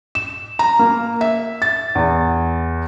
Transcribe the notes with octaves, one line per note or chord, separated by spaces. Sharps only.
E7
A#5
A#3
E5
A6
E2